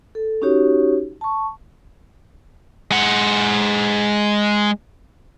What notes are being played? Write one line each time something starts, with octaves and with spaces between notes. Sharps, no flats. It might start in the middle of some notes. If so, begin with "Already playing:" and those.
A4
C#4 D#4 F#4 G4 C#5
A5 C#6
G#3 F#5